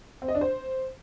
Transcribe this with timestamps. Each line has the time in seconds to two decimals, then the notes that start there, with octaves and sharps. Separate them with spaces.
0.22 C4
0.28 D#5
0.35 D4
0.41 C5